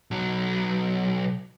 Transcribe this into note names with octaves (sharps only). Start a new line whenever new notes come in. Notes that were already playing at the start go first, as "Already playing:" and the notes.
B1 F#3